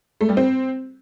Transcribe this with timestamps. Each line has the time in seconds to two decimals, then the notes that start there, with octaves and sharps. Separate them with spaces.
0.21 A3
0.29 G3
0.37 C4